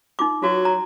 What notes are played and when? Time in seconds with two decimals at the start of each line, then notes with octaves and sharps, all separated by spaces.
0.19 D#4 F4 D6
0.42 F#3 F4 F#4 B4
0.65 A#5